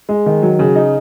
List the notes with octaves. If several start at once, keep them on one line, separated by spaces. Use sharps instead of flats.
G#3
D#3
F#3
C#3
D#4